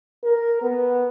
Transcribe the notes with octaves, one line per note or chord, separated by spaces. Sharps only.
A#4
B3